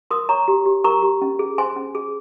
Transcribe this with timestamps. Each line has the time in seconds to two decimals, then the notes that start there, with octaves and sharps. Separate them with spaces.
0.11 A#4 C6 D#6
0.29 C#5 A#5 C#6
0.48 G4
0.66 G4
0.84 A#4 A#5 C#6
1.02 G4
1.22 C#4
1.39 G#4
1.58 C5 G#5 C6
1.76 C#4
1.95 G#4